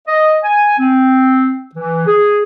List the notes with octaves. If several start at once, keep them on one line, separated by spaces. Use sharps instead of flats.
D#5
G#5
C4
E3
G#4